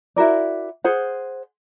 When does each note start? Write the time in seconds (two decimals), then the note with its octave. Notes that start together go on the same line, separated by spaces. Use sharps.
0.16 E4 F#4 A#4 D5
0.84 G#4 C5 F#5